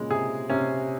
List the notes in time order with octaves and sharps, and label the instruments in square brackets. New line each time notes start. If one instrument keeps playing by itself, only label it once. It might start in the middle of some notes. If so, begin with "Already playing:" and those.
Already playing: [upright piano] A#2 C#3 [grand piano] G#3
[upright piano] C3 [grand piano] G#4
[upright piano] C3 [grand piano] C#4